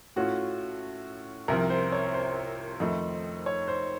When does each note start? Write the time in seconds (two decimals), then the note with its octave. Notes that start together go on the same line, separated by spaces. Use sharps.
0.16 A2 A3 C#4 F4 F#4
1.48 C2 C3 F3 A#4
1.70 C5
1.92 C#5
2.14 C5
2.80 F2 D#3 A3 D#4
3.46 C#5
3.68 C5